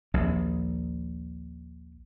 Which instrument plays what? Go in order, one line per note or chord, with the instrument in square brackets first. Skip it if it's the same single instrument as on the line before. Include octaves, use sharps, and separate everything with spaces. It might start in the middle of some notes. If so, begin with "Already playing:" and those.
[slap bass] A#1 D#2